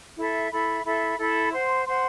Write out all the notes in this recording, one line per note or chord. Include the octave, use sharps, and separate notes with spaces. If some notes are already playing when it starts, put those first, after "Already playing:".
E4 A4 E5 B5
E4 A4 E5 B5
E4 A4 E5 B5
E4 A4 E5 B5
C5 F#5 C6
C5 F#5 C6